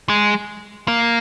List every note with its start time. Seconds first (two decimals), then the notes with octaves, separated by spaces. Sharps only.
0.09 G#3
0.88 A#3